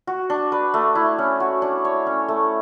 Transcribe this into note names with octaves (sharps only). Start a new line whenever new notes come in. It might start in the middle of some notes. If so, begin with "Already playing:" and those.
F#4
D4
B4
A3
E4
C#4
F#4
D4
C#5
C#4
A3